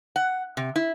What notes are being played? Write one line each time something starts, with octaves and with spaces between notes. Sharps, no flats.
F#5
C3
E4